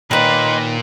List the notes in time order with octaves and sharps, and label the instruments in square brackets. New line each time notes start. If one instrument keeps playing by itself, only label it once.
[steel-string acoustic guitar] D#2 D#3 [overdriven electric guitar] A#2 A#3 [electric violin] B4 [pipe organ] D#5 C6